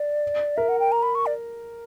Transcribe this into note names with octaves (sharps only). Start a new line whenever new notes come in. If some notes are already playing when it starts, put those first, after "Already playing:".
Already playing: D5
A#4 E5
F#5
G5
A#5
B5
C#6
D5